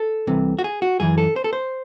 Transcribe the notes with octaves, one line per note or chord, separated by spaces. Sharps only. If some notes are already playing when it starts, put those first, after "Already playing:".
Already playing: A4
C2 C3 E3
F#4
G#4
F#4
F#2 E3 G#4
A4
C5
A4
C5